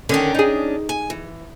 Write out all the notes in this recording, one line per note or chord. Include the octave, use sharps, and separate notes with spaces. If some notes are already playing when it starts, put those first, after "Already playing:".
D3 D#3 C#4 D4
D#4 G#4
G#5
E3